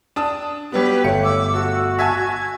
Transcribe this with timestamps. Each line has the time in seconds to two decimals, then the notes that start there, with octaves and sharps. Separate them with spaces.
0.16 D4 A5 D#6
0.72 F#3 G3 B3 G4 B4
1.04 G1 A3 C#5 C#7
1.23 D6 E6
1.54 F#4 A4
1.99 E5 G#5 A5 G#6